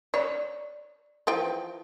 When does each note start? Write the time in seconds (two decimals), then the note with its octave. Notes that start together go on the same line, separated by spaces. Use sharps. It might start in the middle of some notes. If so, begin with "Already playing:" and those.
0.14 C#5 D5
1.27 E3 F3 G5